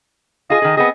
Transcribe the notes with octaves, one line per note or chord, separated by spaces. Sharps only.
F4 G#4 D#5
D#3 G#4
B3 C4 G#4 D#5